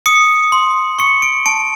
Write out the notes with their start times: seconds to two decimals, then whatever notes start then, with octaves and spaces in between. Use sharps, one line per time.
0.06 D#6 C#7
0.52 C6
0.99 C#6 C#7
1.22 D7
1.46 A5 D7